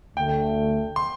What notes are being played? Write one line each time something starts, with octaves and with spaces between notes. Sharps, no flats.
D2 D3 A3 G5
C6